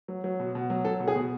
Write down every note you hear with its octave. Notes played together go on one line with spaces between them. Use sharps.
F#3
F#3
B2
B2
F#3
F#3 A4
B2
G#4
B2